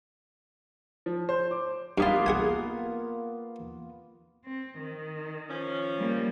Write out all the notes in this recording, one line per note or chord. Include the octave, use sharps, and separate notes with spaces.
F3
C5
D6
G2 A#3 B3 F4
G#4 F#5 G#5
C4
D#3
F3 C#4
G3 A#3